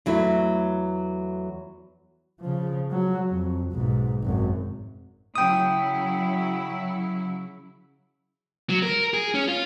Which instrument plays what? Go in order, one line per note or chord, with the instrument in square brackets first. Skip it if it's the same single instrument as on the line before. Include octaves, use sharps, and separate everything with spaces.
[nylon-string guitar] E2 F#3 A3 E4
[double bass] C#3 F3
F#3
F2
B1 G#2
G#1 F#2
[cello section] C#3 F#3 E4 [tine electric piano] G5 D#6
[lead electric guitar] F#3
A#4
G#4
C#4
F4